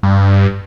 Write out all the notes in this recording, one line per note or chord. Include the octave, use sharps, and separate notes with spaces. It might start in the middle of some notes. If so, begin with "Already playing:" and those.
G2